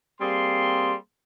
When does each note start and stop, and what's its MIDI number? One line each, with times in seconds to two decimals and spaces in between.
0.21 0.95 55
0.21 0.95 58
0.21 0.95 60
0.21 0.95 68
0.21 0.95 84